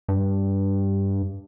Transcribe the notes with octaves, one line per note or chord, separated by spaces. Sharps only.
G2